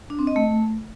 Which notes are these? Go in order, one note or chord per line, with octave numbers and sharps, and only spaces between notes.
D4
C4
D#5
A3